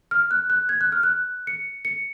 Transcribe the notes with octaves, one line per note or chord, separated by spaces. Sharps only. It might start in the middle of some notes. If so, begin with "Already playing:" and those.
F6
F#6
F#6
G#6
F#6
F6
F#6
C#7
C#7